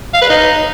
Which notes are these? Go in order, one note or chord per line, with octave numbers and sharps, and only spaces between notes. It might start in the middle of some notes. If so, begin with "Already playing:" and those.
F5
B4
D#4